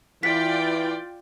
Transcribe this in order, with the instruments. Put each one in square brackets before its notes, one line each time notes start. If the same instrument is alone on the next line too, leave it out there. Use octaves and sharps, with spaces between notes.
[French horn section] E3 E4 [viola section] F4 D5 G5 [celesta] B6